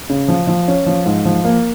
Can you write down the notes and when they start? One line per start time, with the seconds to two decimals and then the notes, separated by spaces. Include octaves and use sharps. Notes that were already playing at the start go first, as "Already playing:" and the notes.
0.10 C#3
0.28 F3
0.47 F3
0.68 C#4
0.86 F3
1.06 G#2
1.25 F3
1.45 A#3